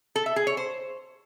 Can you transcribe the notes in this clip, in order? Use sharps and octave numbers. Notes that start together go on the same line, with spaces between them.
A4
E5
G#4
C#5
C5